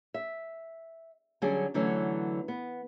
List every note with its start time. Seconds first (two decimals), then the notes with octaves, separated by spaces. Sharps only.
0.14 E5
1.42 D3 F#3 G3 C#4 G#4
1.74 D3 E3 F#3 A3 C#4
2.48 B3